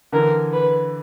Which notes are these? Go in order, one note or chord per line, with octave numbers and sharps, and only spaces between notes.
D3 E3 A#4
B4